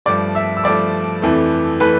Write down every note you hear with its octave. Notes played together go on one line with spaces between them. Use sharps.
G2 F3 A3 D5 D6
E5 E6
E6
G2 F3 A3 D5 D6
F2 E3 A3
E3 A3 B4 B5